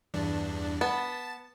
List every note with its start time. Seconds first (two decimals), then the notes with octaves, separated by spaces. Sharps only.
0.14 E2 G2 D4
0.81 B3 A5